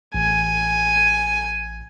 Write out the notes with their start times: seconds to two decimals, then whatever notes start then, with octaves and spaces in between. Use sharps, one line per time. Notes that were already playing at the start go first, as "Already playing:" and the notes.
0.14 A1 G#5